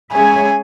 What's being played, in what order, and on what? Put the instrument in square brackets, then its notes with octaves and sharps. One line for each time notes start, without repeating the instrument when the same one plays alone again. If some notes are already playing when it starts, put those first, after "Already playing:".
[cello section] G#3 C#4 G#4 C#5 E5 [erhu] G#5